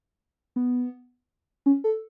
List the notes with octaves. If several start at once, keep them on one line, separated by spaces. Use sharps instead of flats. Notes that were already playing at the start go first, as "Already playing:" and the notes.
B3
C#4
A4